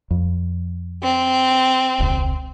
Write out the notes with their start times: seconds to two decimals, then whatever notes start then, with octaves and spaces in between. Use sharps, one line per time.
0.11 F2
1.03 C4
2.00 E1 C#2